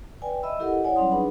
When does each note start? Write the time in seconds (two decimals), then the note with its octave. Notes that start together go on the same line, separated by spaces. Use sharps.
0.22 B4 D5 G5 G#5
0.43 D#5 E5 B5 E6
0.60 E4 G4 A4 A#4 D#5 F#5
0.84 E4 C#5 D5 F#5 G#5
0.96 F#3 G3 C#4 F#5 C6 D#6
1.11 D4 D#4 G#4 B4 B5